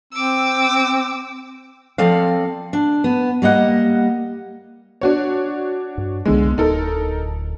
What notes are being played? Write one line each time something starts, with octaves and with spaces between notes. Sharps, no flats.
C4 D6 E6
F3 C4 A4 D5 F5
D4
B3
G3 A#3 D#5 F#5
D4 F#4 C#5
G2
C2 D3 G#3 B3
D1 D#4 A4 A#4